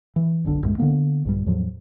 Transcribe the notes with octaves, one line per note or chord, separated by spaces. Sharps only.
E3
F#1 B1 D3 D4
C2 F#2 A2 G#3
D3 F3 A#3 B3
A#1 G2 G3
E2 A2 F3 F#3